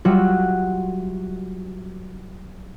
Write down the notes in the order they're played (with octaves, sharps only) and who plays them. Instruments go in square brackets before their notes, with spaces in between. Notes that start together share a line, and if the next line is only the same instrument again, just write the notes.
[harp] F#3 G3 F4 F#4 E5 F#5